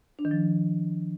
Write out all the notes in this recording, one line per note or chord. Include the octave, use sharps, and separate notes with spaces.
D4
D#3
F3